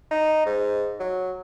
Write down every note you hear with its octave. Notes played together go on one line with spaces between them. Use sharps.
D#4
G#2
F#3